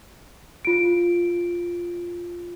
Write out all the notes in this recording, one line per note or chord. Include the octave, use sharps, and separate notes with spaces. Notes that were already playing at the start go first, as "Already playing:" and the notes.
F4 D7